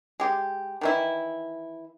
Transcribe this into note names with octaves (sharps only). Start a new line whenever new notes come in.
G#3 G4
D#3 E3 E4